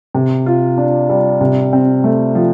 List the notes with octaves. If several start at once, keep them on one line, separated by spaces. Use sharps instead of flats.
C3
F4
D4
G3
C3
C4
A3
F3